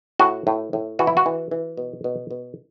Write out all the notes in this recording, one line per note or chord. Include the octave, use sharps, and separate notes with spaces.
A2 F#4
A2
A2
E3 F#4
E4
F#4
E3
E3
B2
B2
B2